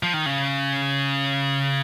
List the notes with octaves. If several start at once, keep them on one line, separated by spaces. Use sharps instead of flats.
F3
D#3
C#3